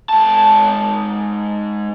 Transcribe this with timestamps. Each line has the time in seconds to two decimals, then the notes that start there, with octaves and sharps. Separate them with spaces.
0.09 G#2 A5